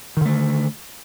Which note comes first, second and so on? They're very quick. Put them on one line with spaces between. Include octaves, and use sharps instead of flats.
D#3 D3 A3